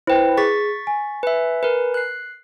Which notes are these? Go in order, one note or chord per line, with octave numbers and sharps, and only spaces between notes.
E4 B4 C5 G5
G#4 C#6 A6 B6
G#5
B4 E5
A#4 B4
F#6 C7